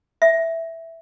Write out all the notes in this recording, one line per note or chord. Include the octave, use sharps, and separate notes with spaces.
E5